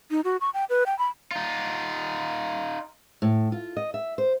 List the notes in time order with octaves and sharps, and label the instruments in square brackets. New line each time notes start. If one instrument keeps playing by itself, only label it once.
[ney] D#4
F#4
C#6
G5
B4
G5
B5
[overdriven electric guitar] D#4 F4
[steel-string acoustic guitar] A2
F4
D#5
E5
C5